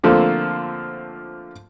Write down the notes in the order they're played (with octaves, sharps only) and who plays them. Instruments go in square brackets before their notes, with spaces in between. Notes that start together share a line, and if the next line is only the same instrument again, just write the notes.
[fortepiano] D3 F3 A3 A#3 C4 F4